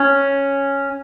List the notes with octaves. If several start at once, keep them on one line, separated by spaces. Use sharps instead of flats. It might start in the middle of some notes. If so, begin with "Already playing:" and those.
Already playing: C#4